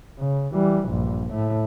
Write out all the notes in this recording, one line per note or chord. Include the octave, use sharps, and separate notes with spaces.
C#3
E3 G3
A#1 G2
A2 A3